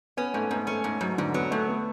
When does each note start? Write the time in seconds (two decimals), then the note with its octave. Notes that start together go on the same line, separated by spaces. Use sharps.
0.17 B3 C#4
0.34 G#2 A3
0.51 G#2 B3
0.67 A3 C#4
0.84 G#2
1.01 G#2 F#3
1.18 G#2 D3
1.34 F#3 B3
1.51 G#2 A3
1.68 B3